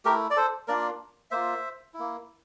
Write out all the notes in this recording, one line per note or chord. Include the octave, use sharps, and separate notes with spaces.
A3 E4 G4 A#4
D5
A4 C5
A#3 D4 F4 A#4 D5
A#3 F4 C5 E5
E4
A#3